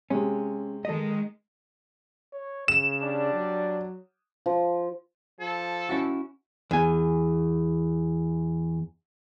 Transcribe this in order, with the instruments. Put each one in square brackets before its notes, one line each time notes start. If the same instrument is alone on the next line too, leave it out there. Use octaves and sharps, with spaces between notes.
[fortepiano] C3 [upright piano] G#3 [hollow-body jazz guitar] C#4
[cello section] D#3 G#3 [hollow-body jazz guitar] A4 D#5
[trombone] C#5
[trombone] C#3 [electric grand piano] E7
[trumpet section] G3 D4
[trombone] F#3
[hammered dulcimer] F3
[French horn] F3 [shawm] A4
[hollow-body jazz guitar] C#4 E4 F#4
E2 G#5